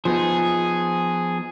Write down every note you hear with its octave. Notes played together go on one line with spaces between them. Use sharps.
F3 B3 D#4 G#4